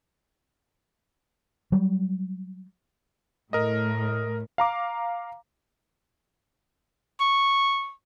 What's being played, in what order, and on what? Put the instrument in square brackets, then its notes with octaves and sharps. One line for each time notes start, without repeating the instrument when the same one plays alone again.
[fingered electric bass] F#3 G3
[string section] A2 [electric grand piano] A#4 D#5
[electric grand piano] F5 A#5 D6
[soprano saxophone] C#6